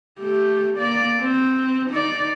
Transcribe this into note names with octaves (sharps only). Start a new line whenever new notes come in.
A3 G4
A#3 D5
C4
D#4 D5